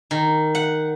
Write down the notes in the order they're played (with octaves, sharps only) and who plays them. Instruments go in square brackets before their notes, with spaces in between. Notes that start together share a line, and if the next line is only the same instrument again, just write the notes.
[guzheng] D#3
F#5